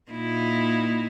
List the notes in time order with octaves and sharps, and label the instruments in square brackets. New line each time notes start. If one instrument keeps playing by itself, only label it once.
[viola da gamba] A#2 D#4 E4